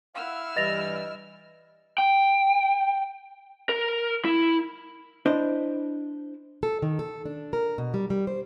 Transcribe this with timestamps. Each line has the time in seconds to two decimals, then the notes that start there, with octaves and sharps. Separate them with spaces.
0.15 E4 F5 F#5 E6 F6
0.57 G2 E3 G3 D#5 A6 A#6 F7
1.98 G5
3.69 A#4
4.25 E4
5.26 D4 E4 C5 D#5
6.63 A4
6.82 D#3
6.99 A4
7.25 D4
7.53 A#4
7.78 B2
7.94 G3
8.10 G3
8.27 C5